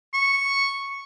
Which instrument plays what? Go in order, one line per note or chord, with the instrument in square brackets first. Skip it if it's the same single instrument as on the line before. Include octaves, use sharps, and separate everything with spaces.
[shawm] C#6